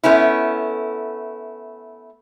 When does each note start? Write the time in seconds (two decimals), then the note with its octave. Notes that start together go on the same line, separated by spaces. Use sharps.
0.03 A3 B3 C#4 E4